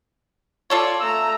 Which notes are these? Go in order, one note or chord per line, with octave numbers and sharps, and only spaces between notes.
F4 A4 C#5 D5
A3 A#5 E6